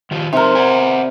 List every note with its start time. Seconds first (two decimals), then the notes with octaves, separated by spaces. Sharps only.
0.11 D#3 F3 G4
0.33 C3 D#4 A4 A#4
0.55 D5 F#5 G#5